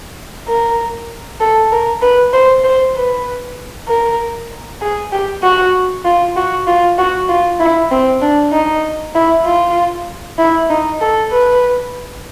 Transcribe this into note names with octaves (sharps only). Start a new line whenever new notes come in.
A#4
A4
A#4
B4
C5
C5
B4
A#4
G#4
G4
F#4
F4
F#4
F4
F#4
F4
E4
C4
D4
D#4
E4
F4
E4
D#4
A4
B4